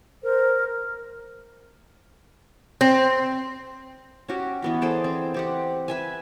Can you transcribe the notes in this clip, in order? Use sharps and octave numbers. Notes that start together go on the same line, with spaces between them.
A#4 C5
C4
C#4 F#4 G4
E3 B3 F#4
G#4 A4 C5 D5
C4
C4 G4 F#5
B4 E5 G#5